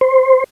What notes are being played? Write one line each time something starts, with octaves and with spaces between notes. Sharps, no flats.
C5